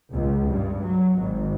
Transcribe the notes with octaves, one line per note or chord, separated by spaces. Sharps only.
C#2
G2
F#3
G#1